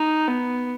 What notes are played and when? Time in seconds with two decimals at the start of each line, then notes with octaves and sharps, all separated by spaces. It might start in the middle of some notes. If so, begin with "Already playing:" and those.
Already playing: D#4
0.27 B3